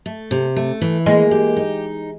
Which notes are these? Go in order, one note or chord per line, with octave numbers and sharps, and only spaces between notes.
A3
C3
A3
E3
G#3 A#3
G4
D#4